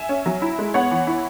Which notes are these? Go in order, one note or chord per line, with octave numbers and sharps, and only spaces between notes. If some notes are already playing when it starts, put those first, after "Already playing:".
Already playing: E5 G#5
C#4
F#3
E4
G#3
B3 C#5 F#5
E3
E4